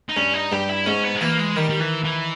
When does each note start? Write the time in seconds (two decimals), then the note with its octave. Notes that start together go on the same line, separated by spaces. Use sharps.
0.09 D#4
0.16 G2 C#4
0.34 D#4
0.52 G2 G4
0.69 E4
0.86 G#2 C#4
1.05 B3
1.16 G#3
1.21 E3 A#3
1.39 G#3
1.56 D#3 G3
1.69 G3
1.80 E3
2.04 E3